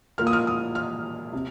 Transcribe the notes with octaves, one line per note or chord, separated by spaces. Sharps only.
A#2 A#3 F6
D#6
F6
D#6
F6
C3